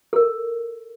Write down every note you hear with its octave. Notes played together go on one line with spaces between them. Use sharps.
A4
A#4